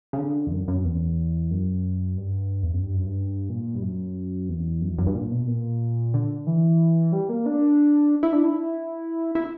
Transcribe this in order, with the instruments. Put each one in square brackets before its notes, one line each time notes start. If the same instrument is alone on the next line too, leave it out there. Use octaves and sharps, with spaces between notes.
[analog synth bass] C#3
D3
E2
F#2
F#2
E2
F#2
G2
E2
F#2
G2
F#2
G2
A#2
G2
F#2
E2
F#2
E2
F#2
G2
A#2
B2
A#2
D3
E3
G3
A#3
D4
E4
D4
E4
E4